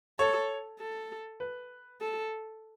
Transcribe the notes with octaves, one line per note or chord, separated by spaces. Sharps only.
A4 C#5
A4
B4
A4